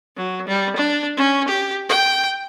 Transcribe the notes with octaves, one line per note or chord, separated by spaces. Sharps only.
F#3
G3
D4
C#4
G4
G5